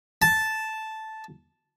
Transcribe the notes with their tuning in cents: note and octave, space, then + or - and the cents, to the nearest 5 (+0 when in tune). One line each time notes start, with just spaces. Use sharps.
A5 -5